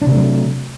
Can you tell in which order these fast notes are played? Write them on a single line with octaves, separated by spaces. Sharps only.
D4 C3 A3 F#3